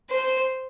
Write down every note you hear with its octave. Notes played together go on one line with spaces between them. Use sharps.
C5